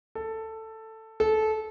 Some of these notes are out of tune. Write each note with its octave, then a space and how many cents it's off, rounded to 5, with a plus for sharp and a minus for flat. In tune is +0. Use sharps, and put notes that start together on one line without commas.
A4 +10
A4 -20